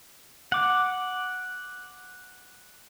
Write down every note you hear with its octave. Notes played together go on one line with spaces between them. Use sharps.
F#5 D6